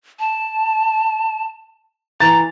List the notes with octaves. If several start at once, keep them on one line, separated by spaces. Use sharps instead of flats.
A5
E3 A#5 A6